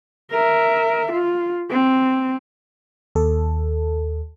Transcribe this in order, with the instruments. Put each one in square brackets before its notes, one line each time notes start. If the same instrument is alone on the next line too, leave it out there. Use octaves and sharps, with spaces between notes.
[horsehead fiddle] A#4 E5
F4
C4
[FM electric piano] D#2 A4